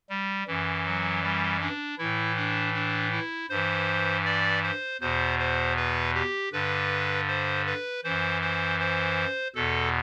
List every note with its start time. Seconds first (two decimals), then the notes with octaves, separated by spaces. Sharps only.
0.10 G3
0.47 F#2 E3
0.85 F#3
1.23 G3
1.61 D4
1.98 A2 E3 E4
2.36 D4
2.74 D4
3.12 E4
3.49 G2 E3 C5
4.25 D5
4.63 C5
5.01 E2 B2 C5
5.39 C5
5.77 B4
6.15 G4
6.53 G2 D3 B4
7.28 C5
7.66 B4
8.04 F#2 E3 C5
8.42 C5
8.80 C5
9.55 E2 B2 A4